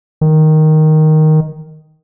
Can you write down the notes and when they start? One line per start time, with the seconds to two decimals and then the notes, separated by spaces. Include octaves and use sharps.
0.21 D#3